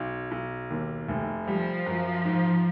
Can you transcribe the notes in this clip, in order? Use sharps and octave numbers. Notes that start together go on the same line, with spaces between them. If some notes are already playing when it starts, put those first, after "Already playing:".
Already playing: B1
B1
D#2
F1
F3 G3
F#2
G#2